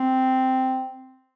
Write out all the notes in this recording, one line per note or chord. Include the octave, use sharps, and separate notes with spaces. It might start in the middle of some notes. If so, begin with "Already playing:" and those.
Already playing: C4